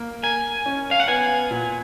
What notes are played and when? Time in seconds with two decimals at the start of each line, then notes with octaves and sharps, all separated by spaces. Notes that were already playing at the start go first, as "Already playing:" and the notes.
Already playing: A#3
0.23 A#4 G#5
0.66 C#4
0.91 F5
1.00 F#5
1.08 B3 G#5
1.51 A#2